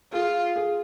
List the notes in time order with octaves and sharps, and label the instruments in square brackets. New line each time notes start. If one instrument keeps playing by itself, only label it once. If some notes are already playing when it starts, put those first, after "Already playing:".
[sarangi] F4 [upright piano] G#4
[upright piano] G#4